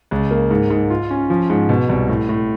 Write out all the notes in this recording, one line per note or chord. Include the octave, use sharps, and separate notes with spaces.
C#2
A#3
G#2
G#2
F4
C#4
F3
G#2
B2
C2
A2
A2